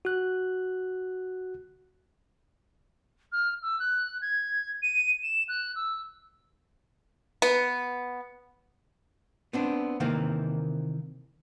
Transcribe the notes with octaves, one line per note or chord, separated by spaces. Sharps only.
F#4 F#6
F6
E6
F#6
G#6
D#7
E7
F#6
E6
B3
B3 C4 D4
C3 D#3 E3 A#3 C4